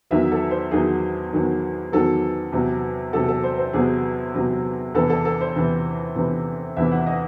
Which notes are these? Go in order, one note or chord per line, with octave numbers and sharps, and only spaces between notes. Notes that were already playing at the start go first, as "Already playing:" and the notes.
E2 D#3 F#3 E5
A4
C5
E2 D#3 F#3 G#4
E2 D#3 F#3
E2 D#3 F#3 A4
E2 C3 F#3
E2 C3 F#3 A4
A4
C5
C5
E2 C3 F#3 G#4
E2 C3 F#3
E2 C3 E3 A4
A4
A4
C5
E2 C3 E3
E2 C3 E3
E2 C3 E3 E5
F#5
D#5